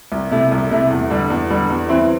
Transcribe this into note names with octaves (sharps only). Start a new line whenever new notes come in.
C2
C3 A3 E4
C2
C3 A3 E4
E2
D3 G3
E2
D3 G3
E2
E3 C4 E4